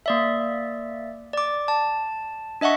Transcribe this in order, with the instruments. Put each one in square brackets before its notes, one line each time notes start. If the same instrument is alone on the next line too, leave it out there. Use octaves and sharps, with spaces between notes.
[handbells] A#3 D5 E5
D5 D6
A5
D4 D#5 E5 F#5 C#6